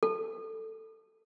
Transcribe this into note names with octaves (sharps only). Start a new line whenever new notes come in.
A4